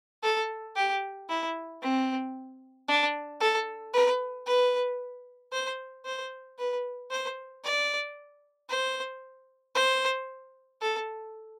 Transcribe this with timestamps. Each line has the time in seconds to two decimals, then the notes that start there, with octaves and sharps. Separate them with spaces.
0.23 A4
0.76 G4
1.29 E4
1.82 C4
2.88 D4
3.40 A4
3.93 B4
4.46 B4
5.52 C5
6.05 C5
6.59 B4
7.11 C5
7.64 D5
8.69 C5
9.75 C5
10.81 A4